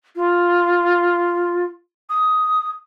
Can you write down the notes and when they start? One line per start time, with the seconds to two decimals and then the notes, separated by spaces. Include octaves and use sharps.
0.15 F4
2.10 D#6